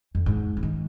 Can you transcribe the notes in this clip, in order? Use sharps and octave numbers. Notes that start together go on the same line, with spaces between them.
F2
G#2
C#3
D#3